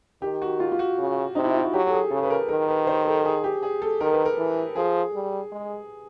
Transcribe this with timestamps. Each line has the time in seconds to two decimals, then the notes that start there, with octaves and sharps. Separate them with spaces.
0.22 D#3 G4
0.42 F#4
0.60 F4
0.72 F4
0.79 F#4
0.98 C#3
1.35 C3 D#4
1.44 E4
1.54 F4
1.63 F#4
1.73 F#3 G4
1.87 A4
1.92 G#4
2.11 C#3 A4
2.23 B4
2.30 A#4
2.49 D#3 A#4
2.68 B4
2.87 C5
3.06 A4
3.25 G#4
3.44 G4
3.63 G#4
3.82 A4
4.00 D#3 A#4
4.13 B4
4.25 A#4
4.38 E3
4.76 F3 G#4
5.14 G3
5.52 G#3